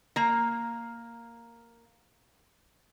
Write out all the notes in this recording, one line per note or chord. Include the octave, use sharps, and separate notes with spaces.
A#3 A#5